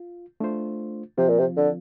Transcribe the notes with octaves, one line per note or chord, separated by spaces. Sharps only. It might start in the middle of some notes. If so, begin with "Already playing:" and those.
Already playing: F4
A3 D4 F4 C5
C3 F3 C4 F4
A#2
C3
D3